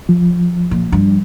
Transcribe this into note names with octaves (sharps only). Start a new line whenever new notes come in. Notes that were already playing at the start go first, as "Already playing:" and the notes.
F3
A#2
G2